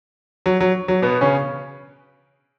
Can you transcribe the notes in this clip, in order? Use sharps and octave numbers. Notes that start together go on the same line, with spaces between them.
F#3
F#3
F#3
B2 B3
C#3 C#4